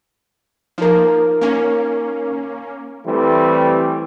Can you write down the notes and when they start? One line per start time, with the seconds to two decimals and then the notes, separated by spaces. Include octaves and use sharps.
0.78 F3 A#3 D#4 A#4
1.41 A#3 C#4
3.05 E3 G3 A3 C4